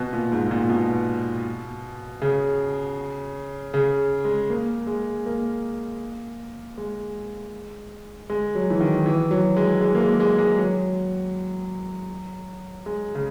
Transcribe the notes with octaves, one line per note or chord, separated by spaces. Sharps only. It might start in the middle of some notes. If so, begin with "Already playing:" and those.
Already playing: B2
A#2
G#2
A#2
B2
C#3
C#3
G#3
A#3
G#3
A#3
G#3
G#3
F#3
E3
D#3
E3
F#3
G#3
G#3
A#3
G#3
G#3
G#3
F#3
G#3
C#3